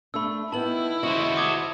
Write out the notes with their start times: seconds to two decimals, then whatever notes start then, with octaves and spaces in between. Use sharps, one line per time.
0.14 A3 D4 B5 E6
0.52 D#3 B3 E4 G5 A5 F#7
1.03 G#3 C#4 F#4 C5 D#5 F#7
1.37 D6 D#6 G#6